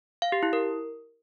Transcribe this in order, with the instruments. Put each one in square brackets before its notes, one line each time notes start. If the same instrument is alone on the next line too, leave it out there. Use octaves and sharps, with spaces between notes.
[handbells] F5
G4
E4
A#4